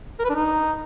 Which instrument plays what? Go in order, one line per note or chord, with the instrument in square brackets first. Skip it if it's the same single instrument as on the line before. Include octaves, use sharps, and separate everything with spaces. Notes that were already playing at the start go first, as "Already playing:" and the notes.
[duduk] A#4
B4
D4
D#4